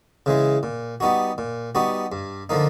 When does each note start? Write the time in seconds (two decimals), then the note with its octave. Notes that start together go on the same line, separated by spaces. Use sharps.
0.26 C#3 E3 G#3
0.63 A#2
1.00 G3 B3 D#4 F#4
1.38 A#2
1.75 G3 B3 D#4 F#4
2.12 G2
2.49 D3 F3 A#3 D#4